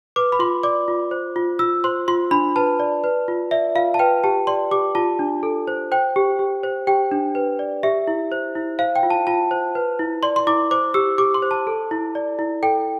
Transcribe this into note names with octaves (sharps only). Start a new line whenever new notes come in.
B4 D6
B5
F4 C6
D5 D6
F4
C5
F4
F4 E6
C5 C6
F4 C6
D4 B5
B4 A5
D5
B4
F4
D5 E5
F4 F5
A5
B4 G5
G4 A5
D5 C6
G4 D6
F4 A5
D4
A4
C5
C5 G5
G4
G4
C5
G4 G5
D4
B4
D5
G4 E5
E4
C5
E4
C5 F5
G5
F4
A5
F4 A5
C5
B4
E4
D5 C6
C6
E4 D6
C5 D6
G4 E6
G4 D6
C6
C5
A5
A4
E4
D5
E4
A4 G5